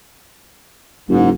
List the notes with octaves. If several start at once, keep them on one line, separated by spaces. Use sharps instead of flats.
F#1 G#2